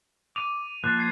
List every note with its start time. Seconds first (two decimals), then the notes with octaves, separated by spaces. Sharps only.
0.36 D6 D#7 F7
0.84 F3 A#3 C5 F#6 A6 C7
0.98 F#6 G#6 C7